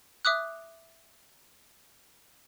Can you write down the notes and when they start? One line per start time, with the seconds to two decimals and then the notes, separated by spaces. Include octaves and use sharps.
0.25 E5 D6 D#6 F#6